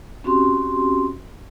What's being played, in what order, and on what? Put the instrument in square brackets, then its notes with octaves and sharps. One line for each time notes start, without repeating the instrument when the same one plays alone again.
[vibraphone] C4 C#4 F#4 G4 C6